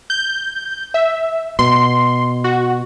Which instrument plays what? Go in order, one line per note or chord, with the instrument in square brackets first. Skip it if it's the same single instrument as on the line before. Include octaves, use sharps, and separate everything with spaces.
[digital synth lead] G6
E5
[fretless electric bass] B2 [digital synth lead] C6
[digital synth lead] F#4